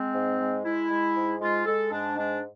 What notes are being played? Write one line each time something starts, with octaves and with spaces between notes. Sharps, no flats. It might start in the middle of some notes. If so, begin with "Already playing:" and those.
Already playing: G#3 C4
G#2
G#3
G#3 E4
G#3
G#2
G#3 F4
G#3 A4
G#2 D4
G#3 D4